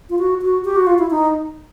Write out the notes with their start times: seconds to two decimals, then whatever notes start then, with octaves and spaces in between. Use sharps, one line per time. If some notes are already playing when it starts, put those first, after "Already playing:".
0.10 F4
0.19 F#4
0.42 F#4
0.65 G4
0.76 F#4
0.87 F4
0.99 E4
1.11 D#4